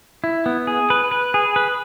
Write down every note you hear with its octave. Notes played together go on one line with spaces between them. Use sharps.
E4
B3
G#4
B4
B4
G#4
B4